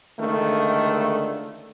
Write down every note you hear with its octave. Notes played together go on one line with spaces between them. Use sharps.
C#2 D3 D#3 A3